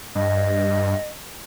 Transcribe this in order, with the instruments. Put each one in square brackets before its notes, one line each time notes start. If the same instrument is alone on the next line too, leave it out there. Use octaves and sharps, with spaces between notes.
[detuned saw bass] G2 [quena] D#5